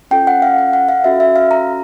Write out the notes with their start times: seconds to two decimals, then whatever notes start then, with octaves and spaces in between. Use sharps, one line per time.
0.11 C#4 F4 A4 G5
0.27 F#5
0.42 F5
0.58 F#5
0.73 F#5
0.89 F5
1.04 C#4 F#4 A4 E5
1.20 E5
1.36 F5
1.51 A#5